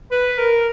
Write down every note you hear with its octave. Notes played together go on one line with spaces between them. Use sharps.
B4
A#4